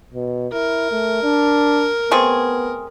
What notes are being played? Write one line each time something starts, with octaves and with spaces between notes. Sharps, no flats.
B2
E4 A#4
A3
D4
A3 B3 C4 G#4